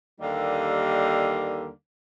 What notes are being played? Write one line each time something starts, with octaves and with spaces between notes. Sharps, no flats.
D#2 D3 G3 A#3 D#4